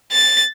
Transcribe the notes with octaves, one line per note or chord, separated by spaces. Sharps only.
A6